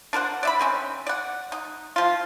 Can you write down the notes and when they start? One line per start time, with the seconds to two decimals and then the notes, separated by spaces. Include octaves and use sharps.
0.13 D4 A#4 C5 F#5
0.43 D5 E5 B5
0.59 D#3 C4 C#4
1.07 D5 F#5
1.52 D#4
1.96 F3 F4